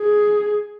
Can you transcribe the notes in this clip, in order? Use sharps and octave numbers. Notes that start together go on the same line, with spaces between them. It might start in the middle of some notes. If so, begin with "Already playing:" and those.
Already playing: G#4